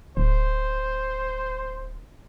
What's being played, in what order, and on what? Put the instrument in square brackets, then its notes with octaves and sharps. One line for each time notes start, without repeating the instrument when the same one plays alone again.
[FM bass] D1 [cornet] C5